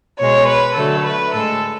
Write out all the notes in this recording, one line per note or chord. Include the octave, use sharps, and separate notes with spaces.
B2 G#3 C#5
B4
D3 F#3 A3 A4
B4
A2 G#3 A4